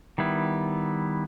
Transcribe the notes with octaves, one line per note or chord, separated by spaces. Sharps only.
D#3 G3 B3 E4